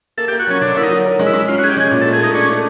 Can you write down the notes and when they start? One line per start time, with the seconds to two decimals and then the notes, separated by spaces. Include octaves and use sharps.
0.17 A#3 A4
0.28 G4
0.32 A#3
0.39 F#4
0.47 F#3 C#4
0.61 D3 D4
0.75 A#3 E4
0.83 D#4
0.90 F#3
1.05 A#4
1.19 G#3
1.26 E4
1.33 G#3
1.48 C#4 F4
1.58 F#4
1.63 C#4 G#4
1.69 G4
1.77 G#3 G#4
1.91 A#2
2.01 A4
2.06 A3
2.13 G#4
2.20 A3 D#4
2.34 C#4 D4
2.49 A3